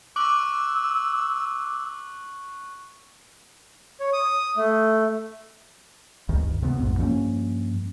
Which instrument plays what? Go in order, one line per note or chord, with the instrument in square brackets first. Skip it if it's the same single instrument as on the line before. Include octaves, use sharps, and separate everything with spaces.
[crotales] C#6 F#6 F#7 [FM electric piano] D6 [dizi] E6
[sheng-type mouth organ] C#5
D#6
A3
[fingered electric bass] D2 G2 D#3
C3 B3
A#1 F2 G#2 B2
G2 F3 A#3 C#4